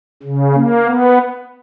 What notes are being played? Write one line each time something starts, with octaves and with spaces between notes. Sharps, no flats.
C#3
A#3
B3